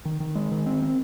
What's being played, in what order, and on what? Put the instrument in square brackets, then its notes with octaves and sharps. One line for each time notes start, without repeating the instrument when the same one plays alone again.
[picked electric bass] D#3
D#3
G#3
D#3
C4
C4